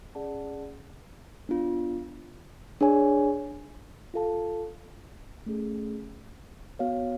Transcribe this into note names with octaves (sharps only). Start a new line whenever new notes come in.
C#4 G#4 D5 F#5 A5
B3 D4 F4
D4 G#4 C#5 G#5
F4 A4 F5 A5
A3 C#4 G#4
B3 F#4 C#5 F5